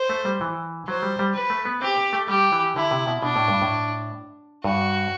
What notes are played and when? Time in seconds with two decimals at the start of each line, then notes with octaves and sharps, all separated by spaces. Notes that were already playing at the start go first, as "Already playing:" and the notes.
Already playing: C5
0.09 A3
0.25 G3
0.41 E3
0.88 F#3 C5
1.03 G3
1.19 G3
1.35 B4
1.50 A3
1.65 B3
1.82 C4 G4
2.13 A3
2.28 G3 G4
2.52 E3
2.76 D3 E4
2.91 C3
3.07 B2
3.22 B2 D4
3.36 A2
3.48 G2
3.62 A2
4.64 G2 F#4